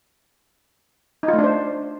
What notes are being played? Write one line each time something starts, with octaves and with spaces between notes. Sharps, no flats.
D#4
F4
A3
D4
C5